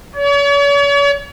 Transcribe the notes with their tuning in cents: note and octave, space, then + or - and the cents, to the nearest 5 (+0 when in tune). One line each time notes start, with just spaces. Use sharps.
C#5 +40